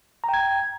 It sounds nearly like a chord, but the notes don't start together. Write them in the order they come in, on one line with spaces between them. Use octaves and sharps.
A#5 G5 G#6